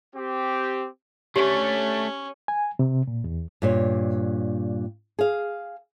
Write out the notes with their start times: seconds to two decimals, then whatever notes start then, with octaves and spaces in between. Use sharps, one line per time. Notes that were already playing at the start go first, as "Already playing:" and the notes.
0.16 C4 G4
1.36 A3 C#4 D4 G4 C#5
2.48 G#5
2.79 C3
3.07 A#2
3.24 E2
3.62 G2 A#2 C#5
5.19 G#4 F5